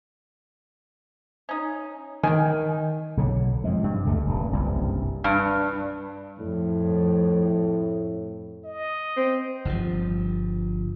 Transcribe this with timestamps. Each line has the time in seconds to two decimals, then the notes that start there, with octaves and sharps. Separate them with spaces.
1.49 C#4 D#4
2.23 D#3 G5 G#5
3.17 B1 D3 F#3
3.64 F2 G#3
3.83 G2 C3
4.06 D2 D3 A3
4.26 D#1 G2
4.52 F#1 C2 G2
5.24 G2
6.39 F2 A2
8.65 D#5
9.16 C4
9.65 G1 G2 B2 F3